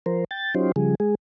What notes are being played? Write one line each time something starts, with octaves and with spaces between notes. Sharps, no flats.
F3 A#4 C5
G5 A6
F#3 C#4 D#4 F4 G4 C5
C#3 F3 G3 G#4
G#3 G#4